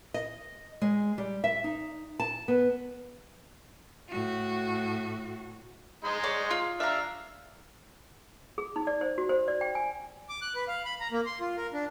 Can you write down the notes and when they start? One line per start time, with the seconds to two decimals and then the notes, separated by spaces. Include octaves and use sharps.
0.14 D#5
0.82 G#3
1.18 G3
1.44 E5
1.64 D#4
2.20 A5
2.48 B3
4.09 A2 F#4
6.05 G#3 D#4 C6
6.24 C#5 D5
6.51 F4
6.80 D4 E5 F5 A#5
8.58 G#4
8.76 D#4
8.87 D5
9.01 C5
9.18 F#4
9.29 C5
9.48 D5
9.61 G5
9.75 G#5
10.29 D6
10.42 F#6
10.55 B4
10.68 F5
10.85 B5
11.00 A#5
11.12 A#3
11.26 C6
11.40 F4
11.57 A#4
11.73 D4